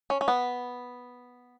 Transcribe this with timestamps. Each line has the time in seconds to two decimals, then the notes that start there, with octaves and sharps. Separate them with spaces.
0.10 C#4
0.21 C#4
0.28 B3